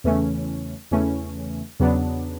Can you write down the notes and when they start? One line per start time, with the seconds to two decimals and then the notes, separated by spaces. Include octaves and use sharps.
0.04 E2 C#3 E3 A3 C#4
0.91 E2 C#3 E3 A3 C#4
1.80 E2 C#3 F#3 B3 D4